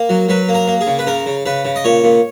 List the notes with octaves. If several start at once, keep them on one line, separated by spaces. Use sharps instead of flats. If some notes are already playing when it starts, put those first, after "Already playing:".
Already playing: A#3
F#3
F#3 B4
A#3
A#4
A#3
G#4
C#3
B4
C#3 A#4
C#3
C#3 B4
C#3
D#5
A#2 C#5
A#2